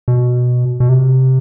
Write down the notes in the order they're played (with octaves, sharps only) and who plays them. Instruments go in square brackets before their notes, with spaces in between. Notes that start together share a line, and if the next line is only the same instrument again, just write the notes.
[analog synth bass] B2
B2
C3